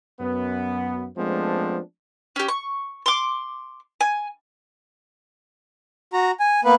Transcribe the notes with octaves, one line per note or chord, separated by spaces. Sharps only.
F#2 B3
F3 G#3 A3 B3 C4 D4
C#4 G4
C#6
C6 D6
G#5
F#4 A#5
G#5
A#3 B3 B4